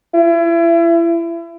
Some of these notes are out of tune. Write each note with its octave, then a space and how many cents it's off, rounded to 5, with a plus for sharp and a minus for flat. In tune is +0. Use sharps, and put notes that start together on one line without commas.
E4 +35